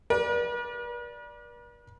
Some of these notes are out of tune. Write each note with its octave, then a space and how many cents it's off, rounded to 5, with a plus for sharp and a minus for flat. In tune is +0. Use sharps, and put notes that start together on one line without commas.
B4 -45 D5 +0